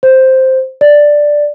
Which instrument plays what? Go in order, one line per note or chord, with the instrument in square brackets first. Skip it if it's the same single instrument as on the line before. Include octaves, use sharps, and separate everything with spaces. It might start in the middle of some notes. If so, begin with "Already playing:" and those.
[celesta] C5
D5